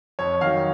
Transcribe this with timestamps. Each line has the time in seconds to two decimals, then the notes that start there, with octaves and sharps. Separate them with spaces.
0.19 F2 C#5
0.41 D#3 F#3 F5